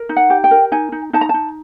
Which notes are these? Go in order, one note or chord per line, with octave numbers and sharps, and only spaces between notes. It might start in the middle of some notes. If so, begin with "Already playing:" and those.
Already playing: A#4
D#4
F#5
G4
G5
A#4
D#4 G#5
D#4
D#4 A5
A#5
D#4 A5